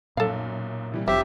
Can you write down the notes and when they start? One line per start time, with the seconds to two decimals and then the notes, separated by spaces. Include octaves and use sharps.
0.17 B1 F#2 A#2 A4 F5
0.92 C3 E3 G3
1.08 F1 B1 F2 C4 G4 E5